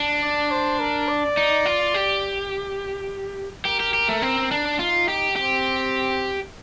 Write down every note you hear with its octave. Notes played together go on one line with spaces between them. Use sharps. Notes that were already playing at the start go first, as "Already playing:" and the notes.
Already playing: D4
D5
C5
A#4
D5
D#4
F4
G4
G4 A#4
G4
G4
A3
C4
D4
D#4 F4
G4
C4 G4